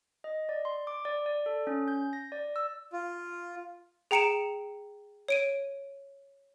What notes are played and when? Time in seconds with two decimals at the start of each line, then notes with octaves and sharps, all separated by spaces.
0.24 D#5
0.49 D5
0.65 C6
0.87 D6
1.05 D5
1.26 D5
1.46 A4
1.67 C#4
1.88 G6
2.13 A#6
2.32 D5
2.56 E6
2.93 F4
4.11 G#4 G5 A#5 C#7 D7 E7
5.28 C#5 D7 D#7